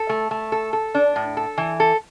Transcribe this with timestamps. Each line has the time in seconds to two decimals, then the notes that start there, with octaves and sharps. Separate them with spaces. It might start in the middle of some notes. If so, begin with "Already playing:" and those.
Already playing: A4
0.09 A3
0.31 A3
0.52 A4
0.73 A4
0.95 D4
1.16 A2
1.37 A4
1.58 E3
1.80 A4